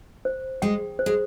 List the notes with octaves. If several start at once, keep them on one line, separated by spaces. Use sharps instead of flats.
C5
G#3 G5
C5
G#3